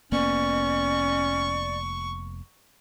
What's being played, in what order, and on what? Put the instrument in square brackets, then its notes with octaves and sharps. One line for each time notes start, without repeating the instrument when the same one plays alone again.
[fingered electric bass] F1 A#3 B3 [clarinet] C#4 [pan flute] D5 [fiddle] C#6